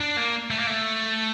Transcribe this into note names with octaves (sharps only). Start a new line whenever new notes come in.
D4
A#3
A3
A#3
A3